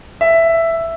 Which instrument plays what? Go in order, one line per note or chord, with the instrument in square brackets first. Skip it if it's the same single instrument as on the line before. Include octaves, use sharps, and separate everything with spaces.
[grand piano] E5